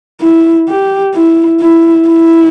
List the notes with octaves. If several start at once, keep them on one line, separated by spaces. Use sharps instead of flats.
E4
G4
E4
E4
E4